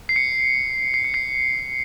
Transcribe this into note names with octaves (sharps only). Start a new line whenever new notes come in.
C7
C#7
C7
C#7
C7